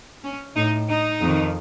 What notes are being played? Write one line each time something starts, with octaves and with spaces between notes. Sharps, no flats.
C#4
A2 D#4
D#4
F2 D#3